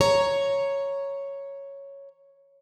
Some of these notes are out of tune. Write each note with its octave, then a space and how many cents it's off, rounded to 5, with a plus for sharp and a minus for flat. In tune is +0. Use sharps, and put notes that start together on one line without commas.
C#5 +0 A#5 +0